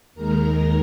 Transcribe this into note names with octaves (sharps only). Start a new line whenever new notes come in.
D#2 D#3 G#3 A#4 A#5